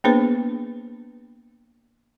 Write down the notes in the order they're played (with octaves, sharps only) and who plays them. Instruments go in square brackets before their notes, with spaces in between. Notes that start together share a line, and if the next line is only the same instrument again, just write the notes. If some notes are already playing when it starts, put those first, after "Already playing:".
[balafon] A#3 B3 D4 G#4 B4 C5